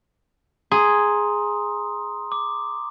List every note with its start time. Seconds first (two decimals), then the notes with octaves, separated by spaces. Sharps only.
0.71 G#4 A#5 C6 D#6
2.32 D6